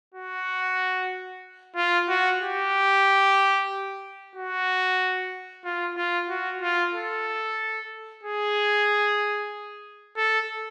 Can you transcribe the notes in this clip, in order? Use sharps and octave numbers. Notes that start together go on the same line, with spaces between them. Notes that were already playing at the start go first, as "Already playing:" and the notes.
F#4
F4
F#4
G4
F#4
F4
F4
F#4
F4
A4
G#4
A4